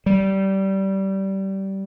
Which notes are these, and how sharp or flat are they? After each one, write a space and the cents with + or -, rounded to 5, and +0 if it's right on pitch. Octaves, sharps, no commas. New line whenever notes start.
G3 -20